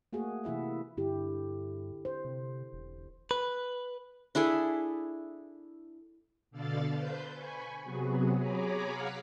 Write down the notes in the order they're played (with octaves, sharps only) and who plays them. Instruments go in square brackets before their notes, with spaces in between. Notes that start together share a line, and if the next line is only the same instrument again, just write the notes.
[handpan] A3 A#3 F#4 G#4
C3 E3 E4 E5 F#5
[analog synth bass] G2 [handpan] D3 E4 G4
[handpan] C5
[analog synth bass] C3
E1
[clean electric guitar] B4
[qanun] D4 E4 G#4 A4
[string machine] B2 D3 A4 D5 F5 A6
B4 C5 G6
G#5 B5 C#6
C3 F#3 B3 F#4 G#4
G#4 C#5 G#5 A#5 B5 D6
F5 F#5 C#6 F6 B6